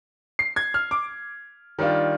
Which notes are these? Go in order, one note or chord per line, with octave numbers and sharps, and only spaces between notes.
C7
G#6
F6
D6
D#3 G3 D4 F4